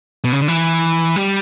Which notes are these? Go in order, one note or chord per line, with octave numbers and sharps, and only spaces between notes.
B2
C#3
D3
E3
G3